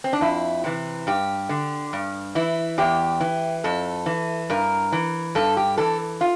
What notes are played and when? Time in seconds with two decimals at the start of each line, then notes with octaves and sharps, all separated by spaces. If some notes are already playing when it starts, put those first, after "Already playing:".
0.04 C4
0.13 D4
0.21 F2 E4
0.64 C3 E3
1.07 G2 G4
1.49 D3
1.93 G2
2.35 E3 E4
2.78 E2 G4
3.20 E3
3.64 F2 A4
4.06 E3
4.50 G2 A#4
4.92 E3
5.35 G2 A4
5.57 G4
5.78 E3 A4
6.21 F4